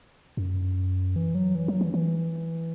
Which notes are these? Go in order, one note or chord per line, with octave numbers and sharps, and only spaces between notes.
F#2
E3
F#3
E3
F#3
E3
E3